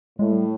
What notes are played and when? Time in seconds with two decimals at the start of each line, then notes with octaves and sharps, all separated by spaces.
0.18 A2 G#3
0.32 G3